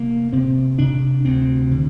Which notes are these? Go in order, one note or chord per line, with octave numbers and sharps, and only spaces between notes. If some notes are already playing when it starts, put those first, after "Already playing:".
Already playing: C3 A#3
C3 C4
C3 D4
D2 C4
D3